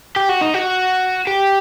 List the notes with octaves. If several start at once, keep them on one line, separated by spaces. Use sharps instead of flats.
G4
F#4
D#4
F#4
G4